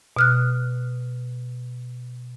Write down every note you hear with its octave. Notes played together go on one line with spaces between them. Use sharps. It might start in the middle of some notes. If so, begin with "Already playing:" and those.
B2 F6 F#6